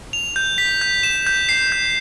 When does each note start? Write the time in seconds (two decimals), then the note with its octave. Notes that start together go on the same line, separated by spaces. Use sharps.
0.13 F7
0.36 G6
0.58 B6
0.82 G6
1.03 E7
1.27 G6
1.49 C7
1.72 G6